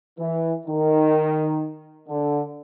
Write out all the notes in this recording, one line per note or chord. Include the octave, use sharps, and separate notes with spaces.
E3
D#3
D3